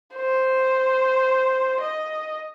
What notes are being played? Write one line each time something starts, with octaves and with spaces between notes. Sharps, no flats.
C5
D#5